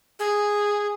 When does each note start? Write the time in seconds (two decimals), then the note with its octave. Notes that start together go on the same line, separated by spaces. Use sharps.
0.19 G#4